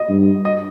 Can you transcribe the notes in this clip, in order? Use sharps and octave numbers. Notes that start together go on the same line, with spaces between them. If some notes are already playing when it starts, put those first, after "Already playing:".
Already playing: D#5
G2
D#5